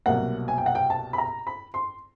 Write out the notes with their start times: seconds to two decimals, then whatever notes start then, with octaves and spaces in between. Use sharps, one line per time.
0.06 C2 B2 F#3 A#3 F#5
0.48 G#5
0.58 G5
0.66 F#5
0.75 G5
0.90 A5
1.13 B5
1.18 A#5
1.47 B5
1.74 C6